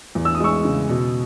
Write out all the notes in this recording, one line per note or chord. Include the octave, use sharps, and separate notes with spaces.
E2
E6
D#6
G#3 C#6 E6
C#3
B2